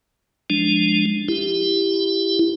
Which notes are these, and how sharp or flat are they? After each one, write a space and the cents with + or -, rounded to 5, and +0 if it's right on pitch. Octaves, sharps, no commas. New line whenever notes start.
F3 +0 G#3 -5 D4 +0
E4 +15 G4 +0